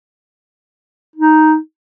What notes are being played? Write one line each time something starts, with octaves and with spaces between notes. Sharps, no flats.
D#4